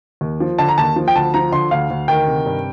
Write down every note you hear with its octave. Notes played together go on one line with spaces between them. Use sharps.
D#2
F3
D3 A5
A#5
D#2 A5
F3
G5
D2 A5
F3 A#5
D3 C6
D2 F5
D2
D#3 G5
C3
G2